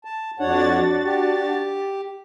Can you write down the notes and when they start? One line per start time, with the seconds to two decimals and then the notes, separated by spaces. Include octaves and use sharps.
0.05 A5
0.40 F2 D4 F#4 C#5 F#5 A6
1.05 G4